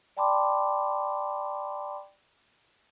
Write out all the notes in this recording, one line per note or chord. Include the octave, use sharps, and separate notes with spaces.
D5 G5 A5 B5 C6 D6